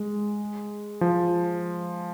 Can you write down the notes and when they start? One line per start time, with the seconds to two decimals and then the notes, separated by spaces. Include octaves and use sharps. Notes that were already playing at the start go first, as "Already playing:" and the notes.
Already playing: G#3
1.01 F3